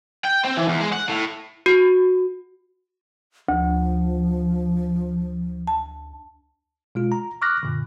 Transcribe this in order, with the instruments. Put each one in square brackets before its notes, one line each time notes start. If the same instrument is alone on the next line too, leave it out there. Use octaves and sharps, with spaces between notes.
[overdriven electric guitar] G5
C4
E3
E2
G#3
F#5
A2
[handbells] F#4
[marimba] D2 [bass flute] F3
[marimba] A5
[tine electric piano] B2 G#3 F4
A#5
C#6 D6 F6 F#6 A#6
F#2 A#2 D3